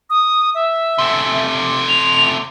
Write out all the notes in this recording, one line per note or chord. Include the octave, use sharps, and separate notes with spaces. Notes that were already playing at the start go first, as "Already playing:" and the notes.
D#6
E5
C3 A3
F7